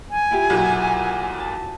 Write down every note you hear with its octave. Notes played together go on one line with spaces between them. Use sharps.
G#5
E4 F4 G4
B1 A#2 F#4
A5